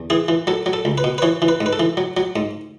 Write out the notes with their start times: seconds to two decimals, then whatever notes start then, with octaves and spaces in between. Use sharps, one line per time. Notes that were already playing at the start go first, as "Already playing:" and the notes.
Already playing: E2
0.10 E3 G#4
0.28 E3
0.47 F#3 A4
0.66 F#3
0.73 A4
0.85 C#2
0.98 B4
1.04 B2
1.18 B4
1.22 E3 C#5
1.42 E3
1.48 B4
1.61 G#2
1.66 B4
1.73 A4
1.80 E3
1.97 F#3
2.17 F#3
2.36 G#2